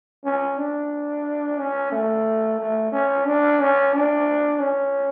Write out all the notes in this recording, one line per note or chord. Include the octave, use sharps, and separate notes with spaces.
C#4
D4
C#4
A3
A3
C#4
D4
C#4
D4
C#4